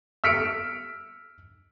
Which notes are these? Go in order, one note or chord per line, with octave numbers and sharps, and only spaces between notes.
E6 F6 B6 C#7 D7